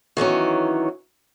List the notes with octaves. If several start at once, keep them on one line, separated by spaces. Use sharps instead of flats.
D#3 E3 F#3 C#4